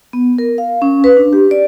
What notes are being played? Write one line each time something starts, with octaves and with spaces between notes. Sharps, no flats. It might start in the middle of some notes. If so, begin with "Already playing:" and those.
B3
A#4
F5
C#4
B4
D4
G4
D5